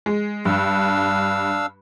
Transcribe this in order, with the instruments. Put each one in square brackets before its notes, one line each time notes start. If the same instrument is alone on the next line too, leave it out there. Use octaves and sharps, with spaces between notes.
[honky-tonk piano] G#3
[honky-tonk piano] G2 [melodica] D4 F5 E6